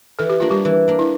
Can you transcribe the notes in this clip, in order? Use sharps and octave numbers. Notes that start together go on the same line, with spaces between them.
E3 A4
G4
A#3 D4 F4
G3 G4
E3
A#3 D4
E4